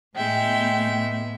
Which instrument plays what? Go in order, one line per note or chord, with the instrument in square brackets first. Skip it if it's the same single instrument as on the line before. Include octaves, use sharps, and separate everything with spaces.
[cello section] A2 B3 [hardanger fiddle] G#3 E5 [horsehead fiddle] G5